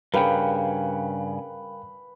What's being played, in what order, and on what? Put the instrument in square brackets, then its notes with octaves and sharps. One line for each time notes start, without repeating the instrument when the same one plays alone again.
[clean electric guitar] G2 C#3 [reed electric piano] A#4 F5 G5 [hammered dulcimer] B4